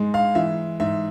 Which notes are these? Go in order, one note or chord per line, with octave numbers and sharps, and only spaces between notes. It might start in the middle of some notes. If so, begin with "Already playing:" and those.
Already playing: G#2 G#3
F5
E3 E5
G#2 E5